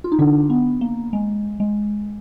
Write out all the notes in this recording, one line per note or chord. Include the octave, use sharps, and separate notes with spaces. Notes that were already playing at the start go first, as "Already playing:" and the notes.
F4
D#4
D3 D4
B3
A#3
G#3
G#3